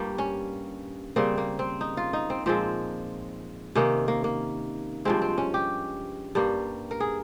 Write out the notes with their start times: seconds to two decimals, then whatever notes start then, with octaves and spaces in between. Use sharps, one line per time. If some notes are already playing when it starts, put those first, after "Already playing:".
Already playing: G2 G3 A#3
0.18 C#4
1.16 C#3 G3 A#3 C4
1.38 A#3
1.59 C4
1.81 D#4
1.97 F4
2.13 D#4
2.30 C4
2.46 A#2 F3 G#3 C4
3.75 C3 D#3 A#3 C#4
4.08 A#3
4.24 A#3
5.05 G2 F3 G#3 C4
5.22 C4
5.38 C#4
5.54 G4
6.35 G2 G3 A#3
6.91 A#4
7.00 G#4